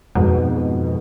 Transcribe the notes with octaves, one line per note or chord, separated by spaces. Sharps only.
F2 G#2 B2